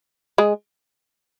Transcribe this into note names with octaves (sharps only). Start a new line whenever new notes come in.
G#3 G#4